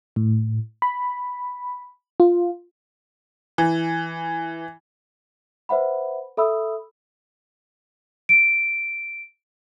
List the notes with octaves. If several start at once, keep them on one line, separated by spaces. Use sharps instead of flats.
A2
B5
F4
E3
B4 C5 E5 F#5 B5
A4 E5 B5 D#6 E6
D7